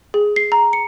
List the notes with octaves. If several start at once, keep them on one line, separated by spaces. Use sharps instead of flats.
G#4
C7
A#5
C#7